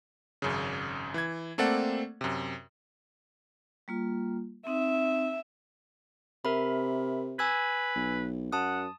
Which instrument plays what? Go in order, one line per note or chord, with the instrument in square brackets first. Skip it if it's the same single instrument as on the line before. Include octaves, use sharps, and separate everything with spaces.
[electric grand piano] G#1 F#2 C#3
E3 G#6
A3 A#3 C4 A4 D5 F#5
F#2 C3
[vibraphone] G3 A#3 F4
[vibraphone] C4 D#4 [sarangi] E5
[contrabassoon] C3 [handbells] A#4 E5 B5
[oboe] B4 [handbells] G#5 E6 G#6
[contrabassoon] B1
[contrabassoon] F#2 [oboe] F#5 [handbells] A5 D#6